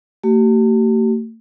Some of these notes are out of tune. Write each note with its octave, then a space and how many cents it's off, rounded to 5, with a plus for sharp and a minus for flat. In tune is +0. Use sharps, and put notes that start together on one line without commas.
A3 +45 G4 -40